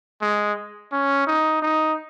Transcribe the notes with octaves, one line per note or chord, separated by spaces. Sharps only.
G#3
C#4
D#4
D#4